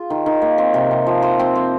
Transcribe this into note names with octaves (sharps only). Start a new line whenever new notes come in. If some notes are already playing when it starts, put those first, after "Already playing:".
Already playing: F4 G#4
D#3
D#3
A#3
C4
C3
C3
F3
C5
C4
C4